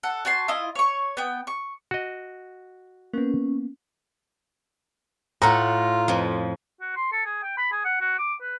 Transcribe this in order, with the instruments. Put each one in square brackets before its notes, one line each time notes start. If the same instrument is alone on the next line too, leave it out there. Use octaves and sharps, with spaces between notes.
[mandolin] A4 F#5
F#4 G#5 A5 C6
E4 F4 D#5
C#5 C#6
B3 G5
C#6
[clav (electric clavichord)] F#4 D#5
[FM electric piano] A#3 B3 [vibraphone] C#4
[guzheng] A2 A4 F#5 [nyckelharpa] F4 [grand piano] A#5
[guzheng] F2 F3
[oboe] F#4
C6
A4
G#4
G5
B5
G#4
F#5
F#4
D6
B4